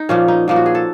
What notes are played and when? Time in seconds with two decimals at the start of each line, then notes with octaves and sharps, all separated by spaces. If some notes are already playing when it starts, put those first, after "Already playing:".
Already playing: D#4
0.09 A#2 F3 A#3 C#4
0.28 D#4
0.48 A#2 F3 A#3
0.56 F#4
0.66 G#4
0.75 A4